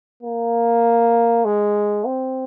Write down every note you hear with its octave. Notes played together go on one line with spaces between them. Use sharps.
A#3
G#3
C4